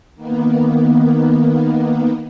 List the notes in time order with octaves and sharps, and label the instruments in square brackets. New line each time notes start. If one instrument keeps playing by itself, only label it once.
[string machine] D#3 A#3 B3